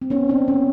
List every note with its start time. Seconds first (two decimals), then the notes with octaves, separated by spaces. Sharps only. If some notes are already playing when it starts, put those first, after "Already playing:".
0.02 C4
0.10 B3 C#4
0.29 C4 D4
0.48 B3 C#4